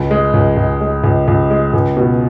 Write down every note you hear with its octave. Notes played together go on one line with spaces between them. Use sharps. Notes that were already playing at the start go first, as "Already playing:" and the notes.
Already playing: C#2
G#3
C#2
C#2
G#3
C#2
C#2
G#3
C#2
B2